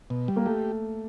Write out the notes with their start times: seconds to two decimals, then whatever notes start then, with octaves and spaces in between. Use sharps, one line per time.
0.10 B2
0.28 G3
0.36 A#3
0.46 A3 G4